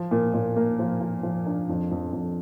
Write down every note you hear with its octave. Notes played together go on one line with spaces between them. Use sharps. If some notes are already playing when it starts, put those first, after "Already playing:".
Already playing: F3
A#2
A#2
A#3
F3
F3
F3
D4
F2
F2
F2